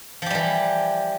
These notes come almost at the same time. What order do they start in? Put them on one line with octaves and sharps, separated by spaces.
F3 G4 G3 E3